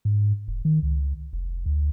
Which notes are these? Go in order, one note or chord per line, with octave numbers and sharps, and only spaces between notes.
G#2
E1
D#3
C#2
F1
D2